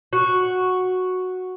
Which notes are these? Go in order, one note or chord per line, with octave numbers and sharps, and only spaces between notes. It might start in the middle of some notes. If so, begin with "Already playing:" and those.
F#4